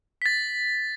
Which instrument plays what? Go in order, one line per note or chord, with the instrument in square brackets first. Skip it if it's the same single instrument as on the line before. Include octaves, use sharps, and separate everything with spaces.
[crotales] A6 B6